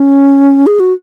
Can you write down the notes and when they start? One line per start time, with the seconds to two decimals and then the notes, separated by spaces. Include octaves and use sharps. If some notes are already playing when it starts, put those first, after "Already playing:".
Already playing: C#4
0.67 G#4
0.80 F#4